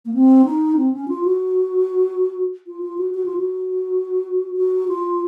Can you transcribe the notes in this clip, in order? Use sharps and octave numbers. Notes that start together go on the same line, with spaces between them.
A#3
C4
D#4
C4
C#4
F4
F#4
F4
F4
F#4
F#4
F4
F#4
F#4
F4